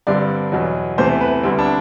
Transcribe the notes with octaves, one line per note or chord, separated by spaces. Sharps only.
G2 D3 G3 C4 D5
E2 B2 F#3
E2 C3 E3 A3 C5
B4
D2 D3 G3 B3 C4
D4